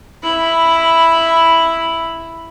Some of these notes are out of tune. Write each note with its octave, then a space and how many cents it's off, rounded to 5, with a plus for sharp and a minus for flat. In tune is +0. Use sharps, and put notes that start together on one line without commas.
E4 +0 B5 +0